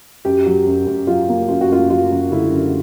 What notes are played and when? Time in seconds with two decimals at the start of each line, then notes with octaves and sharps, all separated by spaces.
0.25 F#2 G4
0.46 F#3
0.67 F#2
0.87 F#2
1.07 F#3 F4
1.29 A#3
1.48 F#2 F4
1.61 F#4
1.70 F#2 F4
1.90 F#3 F4
2.11 F#2
2.31 D3 E4
2.52 F#2